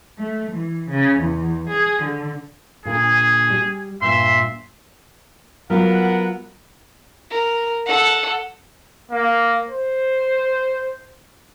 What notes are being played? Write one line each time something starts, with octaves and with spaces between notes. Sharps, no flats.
A3
E3
C#3
E2
G#4
D3
A#2 D3 G#4
G3
G2 A#2 E5 C6
F#3 B3 F4 A#4 F#5
A#4
A4 F#5
A#3
C5